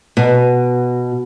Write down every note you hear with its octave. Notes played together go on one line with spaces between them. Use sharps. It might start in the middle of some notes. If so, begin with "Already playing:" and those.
B2